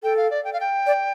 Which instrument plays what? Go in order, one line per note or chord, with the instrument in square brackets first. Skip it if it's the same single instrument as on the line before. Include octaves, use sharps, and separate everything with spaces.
[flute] A4 [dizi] G5
[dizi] F5
D5
G5
F5
G5
[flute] D5